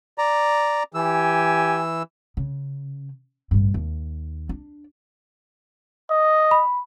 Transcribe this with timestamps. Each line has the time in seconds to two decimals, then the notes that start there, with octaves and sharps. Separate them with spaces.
0.18 D5 A#5
0.94 E3 G4 G#5 E6
2.37 C#3
3.51 A1 G2
3.74 D#2
4.49 D4
6.10 D#5
6.51 B5